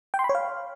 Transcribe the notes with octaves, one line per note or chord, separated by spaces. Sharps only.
G5
C6
B5
C#5
F5